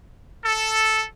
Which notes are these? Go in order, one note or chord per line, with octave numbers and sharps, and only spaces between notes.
A4